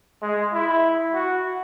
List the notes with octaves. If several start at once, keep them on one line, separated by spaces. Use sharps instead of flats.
G#3
E4
F#4